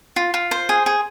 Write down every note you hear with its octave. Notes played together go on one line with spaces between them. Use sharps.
F4
F4
C5
G#4
G#4